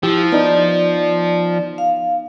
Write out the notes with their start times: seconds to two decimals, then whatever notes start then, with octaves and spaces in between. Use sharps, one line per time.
0.03 F3 E4 G4
0.32 B3 D#4 D5
1.78 F5